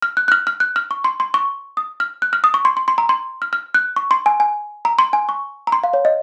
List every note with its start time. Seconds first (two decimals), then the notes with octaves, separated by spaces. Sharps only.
0.02 F6
0.17 F#6
0.28 F#6
0.32 F6
0.47 F6
0.60 F#6
0.76 F6
0.91 C#6
1.04 C6
1.20 C6
1.34 C#6
1.77 D#6
2.00 F6
2.22 F#6
2.33 F6
2.44 D#6
2.54 C#6
2.65 C6
2.77 C6
2.88 C6
2.98 A#5
3.09 C6
3.42 F6
3.53 F6
3.74 F#6
3.96 C#6
4.11 C6
4.26 G#5
4.40 G#5
4.85 A#5
4.99 C6
5.13 G#5
5.29 C#6
5.67 A#5
5.72 C6
5.84 F5
5.94 C#5
6.05 D#5